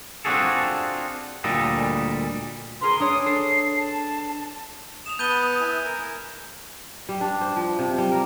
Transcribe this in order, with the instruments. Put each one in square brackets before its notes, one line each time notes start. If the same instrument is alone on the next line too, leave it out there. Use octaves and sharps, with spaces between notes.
[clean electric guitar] C4 D4 F4 F#4 G#4 A4
D2 A#2 G3 A4 D#5
[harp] G#4 A#4 B4 [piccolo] C6
[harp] D4 C#5 [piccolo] D#6
[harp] A4 [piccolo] C7
[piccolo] A5
[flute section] D#6 [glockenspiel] E7 F7
[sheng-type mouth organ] B3 B4 A5 [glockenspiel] G6 D#7 G7
[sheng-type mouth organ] E4 B4 G#5
A#4 G#5
[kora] G3
D4
C5
F3
C3
G3
A#4